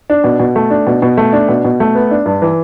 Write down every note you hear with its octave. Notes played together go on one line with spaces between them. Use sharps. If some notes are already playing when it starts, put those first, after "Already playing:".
D4
B2
B2
A3
D4
B2
B2
A3
D4
B2
B2
A3
B3
D4
G2
E3